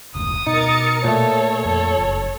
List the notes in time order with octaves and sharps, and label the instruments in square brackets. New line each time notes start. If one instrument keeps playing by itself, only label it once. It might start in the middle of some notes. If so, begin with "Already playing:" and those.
[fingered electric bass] F1 D2 G#2 [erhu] D#6
[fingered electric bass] B2 [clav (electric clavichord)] D#4 [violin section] A#4 A6 C#7
[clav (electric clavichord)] A#2 A3 [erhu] A4 [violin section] C#5
[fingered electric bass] F2 [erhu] A4
[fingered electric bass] F#1